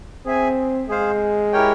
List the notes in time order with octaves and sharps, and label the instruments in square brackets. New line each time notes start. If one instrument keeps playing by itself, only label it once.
[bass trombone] C4 [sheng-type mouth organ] G#4 E5 G#5
[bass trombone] G#3 [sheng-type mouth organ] G#4 C5 F5
[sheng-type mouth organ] E4 G4 A#4 C#5 G5